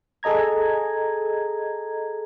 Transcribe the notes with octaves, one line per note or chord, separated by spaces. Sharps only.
G#4 A4 D#5 A#5 G#6